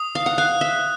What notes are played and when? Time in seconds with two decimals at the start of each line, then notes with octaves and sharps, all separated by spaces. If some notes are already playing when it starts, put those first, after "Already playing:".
Already playing: D#6
0.15 F5
0.26 F#5
0.38 F5 F#6
0.61 E5